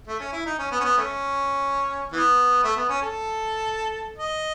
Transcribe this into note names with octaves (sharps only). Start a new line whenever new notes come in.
A3
C#4
E4
D#4
C#4
B3
C#4
B3
A3 C#4
E3 B3
A3
B3
C#4
A4
D#5